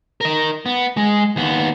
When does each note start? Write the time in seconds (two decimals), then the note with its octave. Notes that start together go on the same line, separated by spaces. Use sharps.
0.21 A#4 D#5
0.66 B3
0.97 G#3
1.36 D#2 B3